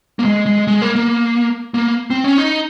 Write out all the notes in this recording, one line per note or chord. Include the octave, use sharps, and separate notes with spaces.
A#3
G#3
G#3
G#3
A#3
A#3
A#3
C4
C#4
D#4